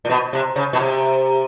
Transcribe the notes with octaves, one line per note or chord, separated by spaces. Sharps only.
A#2
B2
C3
C#3
B2
C3